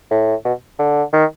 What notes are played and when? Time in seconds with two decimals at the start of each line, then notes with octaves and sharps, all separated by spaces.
0.11 A2
0.45 B2
0.79 D3
1.13 D#3